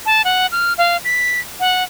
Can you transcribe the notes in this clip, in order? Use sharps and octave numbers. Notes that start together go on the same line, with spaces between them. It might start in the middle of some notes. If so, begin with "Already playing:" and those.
A5
F#5
F6
F5
B6
F#5